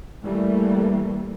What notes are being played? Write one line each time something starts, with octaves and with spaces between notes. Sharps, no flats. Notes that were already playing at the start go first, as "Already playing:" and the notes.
E3 G3 A3 A#3